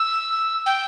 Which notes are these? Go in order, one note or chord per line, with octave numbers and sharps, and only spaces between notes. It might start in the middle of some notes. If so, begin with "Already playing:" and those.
Already playing: E6
G5